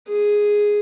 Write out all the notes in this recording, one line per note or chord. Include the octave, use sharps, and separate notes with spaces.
G#4